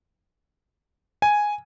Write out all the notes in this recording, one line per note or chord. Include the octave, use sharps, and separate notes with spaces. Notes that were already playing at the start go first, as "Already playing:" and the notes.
G#5